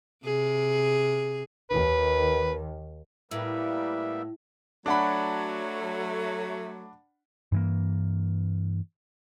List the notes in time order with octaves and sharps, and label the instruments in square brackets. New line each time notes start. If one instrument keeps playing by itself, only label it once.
[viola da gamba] C3 G#4
[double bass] D#2 D#3 [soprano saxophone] B4
[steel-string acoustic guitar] A2 [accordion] G3 A#3 B3 [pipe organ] E5
[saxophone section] F#3 A3 [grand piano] D4 F#5 B5
[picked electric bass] G2 E3 A#3